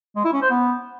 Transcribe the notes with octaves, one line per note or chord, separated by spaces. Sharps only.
G#3
E4
C#4
C5
B3